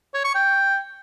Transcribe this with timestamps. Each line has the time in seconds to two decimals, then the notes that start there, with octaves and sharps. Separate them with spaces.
0.14 C#5
0.24 C#6
0.35 G5